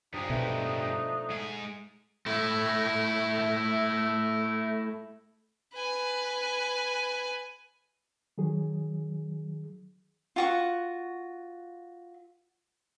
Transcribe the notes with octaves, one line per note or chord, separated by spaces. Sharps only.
G2 F3 G#3 D4 D#4
B2 A3
G#2 G#4
A3 E4
B4 G#5
D#3 F#3 G#4
F4 F#4 C#6